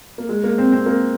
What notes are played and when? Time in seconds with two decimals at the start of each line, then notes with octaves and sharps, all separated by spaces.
0.18 A#3
0.29 G#3
0.44 A#3
0.58 C4
0.72 C4
0.86 A#3